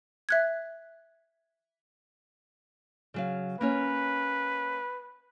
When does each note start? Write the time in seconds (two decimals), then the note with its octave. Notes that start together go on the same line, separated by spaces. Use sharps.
0.29 E5 F#6 G#6
3.14 C#3 F#3 F5
3.61 A#3 C#4 B4 C#5